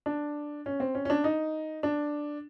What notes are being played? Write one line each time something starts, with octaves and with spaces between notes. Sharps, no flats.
D4
C#4
C4
C#4
C#4
D4
D#4
D4